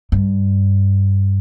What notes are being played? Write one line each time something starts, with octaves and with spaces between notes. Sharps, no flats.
G2